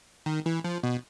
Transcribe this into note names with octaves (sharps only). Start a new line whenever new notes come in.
D#3
E3
F3
B2